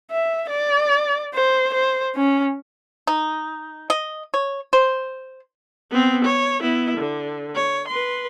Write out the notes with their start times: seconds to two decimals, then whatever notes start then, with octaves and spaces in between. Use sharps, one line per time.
0.11 E5
0.49 D5
1.35 C5
1.74 C5
2.16 C#4
3.07 D#4
3.90 D#5
4.34 C#5
4.73 C5
5.91 B3 C4
6.24 C#5
6.60 B3 E4
6.98 D3
7.56 C#5
7.88 B4 C6